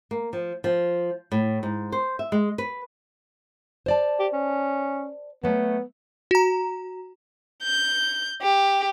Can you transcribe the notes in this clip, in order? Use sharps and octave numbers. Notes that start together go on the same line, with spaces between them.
A#3
F3
F3
A2
G#2
C5
E5
G#3
B4
C5 D5 A5
G4
C#4
F#3 A3 B3
F#4 A#5
G6
G4